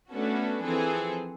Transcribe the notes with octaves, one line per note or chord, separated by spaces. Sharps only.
A3 B3 C#4 D4 F#4 A4
E3 F3 C4 G#4 A4